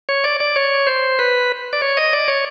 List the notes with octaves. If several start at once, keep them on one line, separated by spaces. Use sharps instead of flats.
C#5
D5
D5
C#5
C5
B4
D5
C#5
D#5
D5
C#5